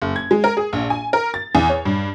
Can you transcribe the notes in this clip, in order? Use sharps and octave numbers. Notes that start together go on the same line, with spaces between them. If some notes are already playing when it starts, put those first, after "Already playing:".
F#1
G#6
G#3
A#4
G#4
A#1
G#5
A#4
A6
E2
C#5
G2